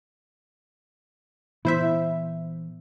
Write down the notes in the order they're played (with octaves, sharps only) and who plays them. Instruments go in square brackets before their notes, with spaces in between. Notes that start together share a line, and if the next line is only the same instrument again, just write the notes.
[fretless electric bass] A#2 E3 B3 [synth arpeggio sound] E4 C5 E5